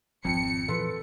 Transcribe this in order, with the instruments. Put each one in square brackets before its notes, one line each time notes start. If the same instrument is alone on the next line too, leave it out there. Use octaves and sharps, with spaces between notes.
[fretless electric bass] G#1 F3 [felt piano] F2 [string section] C#7
[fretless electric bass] A#2 E3 F3 [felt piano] A4 B4 C6